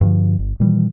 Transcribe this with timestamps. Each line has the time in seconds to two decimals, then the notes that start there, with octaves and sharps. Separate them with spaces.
0.01 G2 D3 D#3 F3
0.39 G1
0.60 A#2 D#3 E3 G3